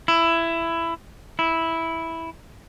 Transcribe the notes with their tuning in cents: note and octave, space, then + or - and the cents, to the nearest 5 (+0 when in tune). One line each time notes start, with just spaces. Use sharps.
E4 +15
E4 -5